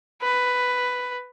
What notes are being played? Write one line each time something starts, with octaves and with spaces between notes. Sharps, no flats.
B4